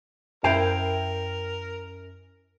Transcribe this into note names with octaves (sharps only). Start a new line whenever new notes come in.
F#2 E4 A#4 C5 F5 G5